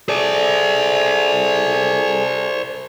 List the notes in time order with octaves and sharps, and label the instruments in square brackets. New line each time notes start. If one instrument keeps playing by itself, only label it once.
[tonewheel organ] G#4 A4 [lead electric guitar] C5 D5